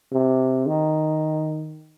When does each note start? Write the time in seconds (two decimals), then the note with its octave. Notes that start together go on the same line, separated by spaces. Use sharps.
0.12 C3
0.67 D#3